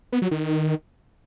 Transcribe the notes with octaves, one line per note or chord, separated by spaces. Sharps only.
B3
F#3
D#3